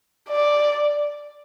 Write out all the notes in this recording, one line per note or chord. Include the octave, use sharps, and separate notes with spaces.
D5